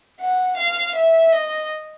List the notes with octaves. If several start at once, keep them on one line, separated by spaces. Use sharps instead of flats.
F#5
F5
E5
D#5